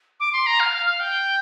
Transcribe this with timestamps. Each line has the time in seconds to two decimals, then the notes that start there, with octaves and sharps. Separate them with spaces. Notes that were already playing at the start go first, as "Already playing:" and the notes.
0.20 D6
0.33 C6
0.46 A#5
0.60 F5
0.73 F5
0.86 F5
1.00 G5